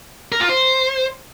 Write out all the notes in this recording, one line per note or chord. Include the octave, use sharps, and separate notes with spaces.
A#4
F4
C5